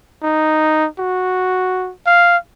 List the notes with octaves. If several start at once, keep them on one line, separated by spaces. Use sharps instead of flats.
D#4
F#4
F5